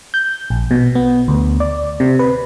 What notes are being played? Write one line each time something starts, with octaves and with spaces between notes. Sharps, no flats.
G6
A#1
B2
B3
D2
D5
C3
B4